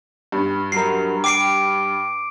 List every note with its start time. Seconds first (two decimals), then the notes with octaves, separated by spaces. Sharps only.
0.32 G2
0.72 F#3 A#4 C7
1.24 G5 D6 C7 D7